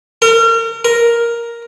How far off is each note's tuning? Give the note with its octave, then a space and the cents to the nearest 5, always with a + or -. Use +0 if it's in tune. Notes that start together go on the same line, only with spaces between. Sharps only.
A#4 -35
A#4 +5